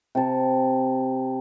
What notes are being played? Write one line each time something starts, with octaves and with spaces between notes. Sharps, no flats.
C3 A5